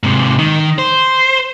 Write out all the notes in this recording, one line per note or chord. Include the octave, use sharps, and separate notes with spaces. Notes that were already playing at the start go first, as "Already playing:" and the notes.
G#2 C3
D#3
C5